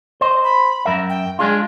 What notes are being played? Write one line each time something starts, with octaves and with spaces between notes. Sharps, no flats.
C5 D#5
B5
F#2 A#4 E5
G5
G#3 D4 F4 G#4